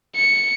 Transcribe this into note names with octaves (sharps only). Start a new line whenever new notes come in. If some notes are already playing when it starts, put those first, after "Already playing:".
C#7